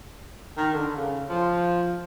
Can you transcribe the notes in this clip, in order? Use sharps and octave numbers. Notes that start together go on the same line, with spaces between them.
D#3
D3
C#3
F3